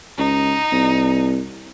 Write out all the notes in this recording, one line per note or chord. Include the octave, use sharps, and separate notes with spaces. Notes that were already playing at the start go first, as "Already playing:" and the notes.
C#2 D#4
C2